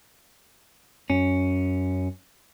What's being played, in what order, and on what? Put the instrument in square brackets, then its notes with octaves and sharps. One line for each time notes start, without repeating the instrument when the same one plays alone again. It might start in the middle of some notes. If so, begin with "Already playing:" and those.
[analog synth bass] F#2 [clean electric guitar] C#4